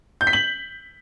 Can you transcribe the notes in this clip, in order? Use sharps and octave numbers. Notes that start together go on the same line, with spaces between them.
G6
B6
F#7